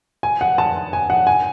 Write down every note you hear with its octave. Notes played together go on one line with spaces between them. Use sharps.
G#5
F#5
A5
G#5
F#5
G#5